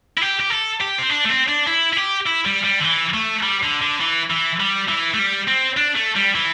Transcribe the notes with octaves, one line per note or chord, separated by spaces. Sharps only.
E4
G4
G4
A4
G4
C4
D4
A3
C4
D4
E4
E4
G4
E4
G3
G3
D3
E3
A3
G3
D3
D3
E3
E3
G3
E3
A3
G3
C4
D4
A3
G3
E3